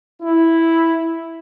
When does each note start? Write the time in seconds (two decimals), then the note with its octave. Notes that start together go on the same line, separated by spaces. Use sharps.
0.23 E4